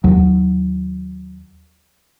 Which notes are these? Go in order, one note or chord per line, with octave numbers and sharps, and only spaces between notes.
D#2 F#3